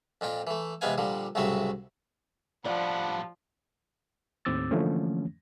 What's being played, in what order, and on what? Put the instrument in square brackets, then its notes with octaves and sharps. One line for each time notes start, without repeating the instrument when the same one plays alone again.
[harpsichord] F2 A#2 F4 G5
E3 A3
E2 C3 G#3 B3 F5 G#5
A#2 D3 F3 G3
C2 A2 C#3 F#3 C4 E5
[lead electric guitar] A2 G3 [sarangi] F3 [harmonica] D4 F#5 B5 [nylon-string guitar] D5
[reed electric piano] D#2 A2 C4 D6 E6 A6
D3 E3 F3 A3 A#3 C#4